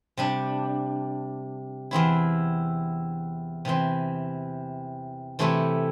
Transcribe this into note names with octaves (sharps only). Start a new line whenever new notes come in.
C3 G3 D4
E2 E3 C4 E4
C3 E3 C4
C3 E3 A3 C4 E4